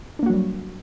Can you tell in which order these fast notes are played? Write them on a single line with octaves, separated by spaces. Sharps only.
D4 A#3 F#4 F#3 G3